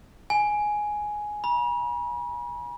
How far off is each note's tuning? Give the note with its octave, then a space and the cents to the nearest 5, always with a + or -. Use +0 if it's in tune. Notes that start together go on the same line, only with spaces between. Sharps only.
G#5 +5
B5 -45